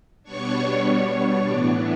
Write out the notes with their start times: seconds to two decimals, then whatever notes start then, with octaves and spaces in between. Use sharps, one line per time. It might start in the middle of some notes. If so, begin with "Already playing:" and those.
0.23 B2 G3 B3 D4 C#5 C#6
1.45 A2 E3 B3 D4 D5 D6